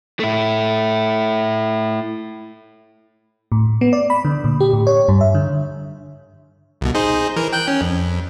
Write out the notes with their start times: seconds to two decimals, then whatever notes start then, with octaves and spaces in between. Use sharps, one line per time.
0.20 A3 E4
3.52 A2
3.81 B3
3.93 D5
4.10 B5
4.25 D3
4.44 A#2
4.60 G4
4.73 A2
4.87 C#5
5.08 G2
5.21 E5
5.35 D3
6.81 C2 B2
6.94 D#4 G#4 C5
7.36 E3 A#4
7.53 G5 F#6 G6
7.68 C#4
7.81 F2